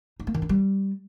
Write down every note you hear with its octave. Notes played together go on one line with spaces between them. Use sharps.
D#4
A#3
D#3
D4
G3